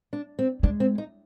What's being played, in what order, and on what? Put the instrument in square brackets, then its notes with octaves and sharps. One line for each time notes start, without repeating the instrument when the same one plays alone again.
[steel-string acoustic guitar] D4
C4
[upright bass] G#3 [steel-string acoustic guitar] D4
[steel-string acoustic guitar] C4
D#4